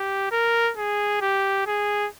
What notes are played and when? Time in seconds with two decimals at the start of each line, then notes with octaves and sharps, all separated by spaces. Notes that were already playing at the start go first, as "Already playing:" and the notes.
Already playing: G4
0.31 A#4
0.77 G#4
1.21 G4
1.67 G#4